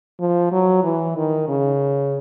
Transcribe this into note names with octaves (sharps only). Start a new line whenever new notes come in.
F3
F#3
E3
D#3
C#3